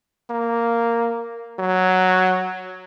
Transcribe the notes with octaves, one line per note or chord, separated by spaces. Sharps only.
A#3
F#3